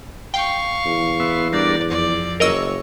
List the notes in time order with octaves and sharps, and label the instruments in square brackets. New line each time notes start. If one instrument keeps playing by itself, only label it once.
[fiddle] F5 C#6 [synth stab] G5
[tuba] E2
[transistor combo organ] B3 E5 C6
[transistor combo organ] G3 D4 A#4 [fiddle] D5
[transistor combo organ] F2 [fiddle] D5
[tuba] F#1 [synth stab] A#4 D#5 E6 [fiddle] C#5